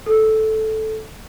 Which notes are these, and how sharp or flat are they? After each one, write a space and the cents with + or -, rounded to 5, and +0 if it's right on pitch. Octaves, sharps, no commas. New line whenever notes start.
A4 -10